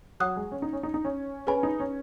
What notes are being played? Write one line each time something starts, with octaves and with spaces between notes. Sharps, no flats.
F#3 F#5 D#6 F#6
G#3
C#4
D#4
C#4
D#4
D#4
C#4
C#4 G#4 B4 G#5 B5
D#4
C#4